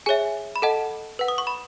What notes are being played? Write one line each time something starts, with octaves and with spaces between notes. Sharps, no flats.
G#4 C#5 E5 G#5
B5
A4 D#5 F#5 A5
B4 F#5
D#6
C#6
B5